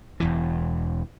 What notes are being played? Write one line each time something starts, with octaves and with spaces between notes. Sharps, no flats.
E1 E2 E3